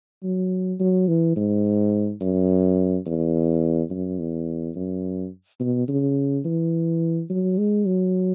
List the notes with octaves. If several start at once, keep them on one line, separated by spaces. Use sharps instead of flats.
F#3
F#3
E3
G#2
F#2
E2
F#2
E2
F#2
B2
C#3
E3
F#3
G#3
F#3